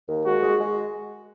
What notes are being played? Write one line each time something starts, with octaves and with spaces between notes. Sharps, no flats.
D#2
G#3 F#4
G#3
G#3